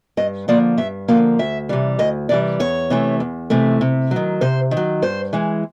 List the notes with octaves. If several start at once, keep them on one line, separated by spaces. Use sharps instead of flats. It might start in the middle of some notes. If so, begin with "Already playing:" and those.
G2 D#5
D3 F3 A#3 D5
G2 E5
D3 F3 A#3 F5
D2 E5
C3 E3 G3
D2 D#5
C3 E3 G3 D5
E2 C#5
C3 E3 A3
E2
C3 E3 A3
C3
D#3 F#3
C3 C5
D#3
F#3
G2 C5
E3 G#3